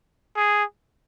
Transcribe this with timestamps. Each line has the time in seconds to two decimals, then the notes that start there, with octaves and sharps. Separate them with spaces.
0.37 G#4